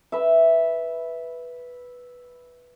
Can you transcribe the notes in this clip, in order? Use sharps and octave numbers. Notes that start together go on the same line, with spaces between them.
B4 E5